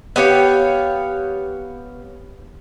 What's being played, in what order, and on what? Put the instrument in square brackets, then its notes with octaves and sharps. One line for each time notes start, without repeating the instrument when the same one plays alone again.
[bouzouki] B3 G4 C#5 F5